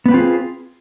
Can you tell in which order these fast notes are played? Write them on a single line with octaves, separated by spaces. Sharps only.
B3 B4 C4 F4 G#4